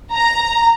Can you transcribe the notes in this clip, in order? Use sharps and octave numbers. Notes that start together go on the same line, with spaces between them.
A#5